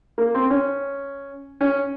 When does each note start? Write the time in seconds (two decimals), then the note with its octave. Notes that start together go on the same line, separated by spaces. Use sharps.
0.18 A#3
0.34 C4
0.50 C#4
1.61 C#4